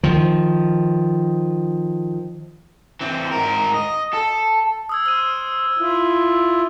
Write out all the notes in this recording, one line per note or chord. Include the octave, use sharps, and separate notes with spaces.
D#3 F3
E3 C4
G#2 A#4
D#5
A4
D#6 E6 G#6
C5 E6 F6 D#7
E4 F4